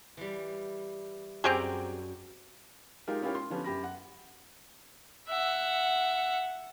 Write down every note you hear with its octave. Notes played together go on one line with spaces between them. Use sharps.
E3 G3
F#2 C4 G4 G#4 D5 A#5
G#3 D#4 F4 G4 A#4
C#4 E4 F4 G4 A#4 C#5
C6
D3 F3 B3 C#4 G4
F#2 G4 B5 A#6
F#5
E5 F#5